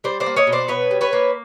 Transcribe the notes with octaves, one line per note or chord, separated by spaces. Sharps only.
G3 C5 D5
C5 D5
A#3
C#5 D#5
B2
C5 D5
B2 B4 C#5
G3
B4 C#5
A#3